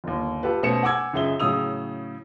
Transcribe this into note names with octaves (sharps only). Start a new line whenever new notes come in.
G1 D#2
F4 G4 A4 B4
B2 A3 C#4 C5 C#7 E7
F#5 G#5 D6 E6 G#6
C#2 F#2 G#4 E5 G7
A2 C#3 F#3 D#6 E6 F7